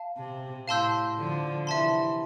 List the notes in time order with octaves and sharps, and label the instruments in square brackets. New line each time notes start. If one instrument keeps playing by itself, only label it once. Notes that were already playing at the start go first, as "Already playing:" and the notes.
Already playing: [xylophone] F5 A5
[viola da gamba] C3
[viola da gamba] A2 [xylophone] F5 A5 C6 E6 G6
[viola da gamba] D3 F3
[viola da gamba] C3 E3 [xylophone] E5 A5 C6